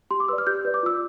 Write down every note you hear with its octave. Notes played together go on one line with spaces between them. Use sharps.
G4 C6
D6
B4 D5 E6
F6
G4 G6
B4 D5
D6
F4 E6